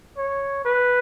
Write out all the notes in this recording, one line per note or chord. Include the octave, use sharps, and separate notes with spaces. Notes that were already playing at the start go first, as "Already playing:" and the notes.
C#5
B4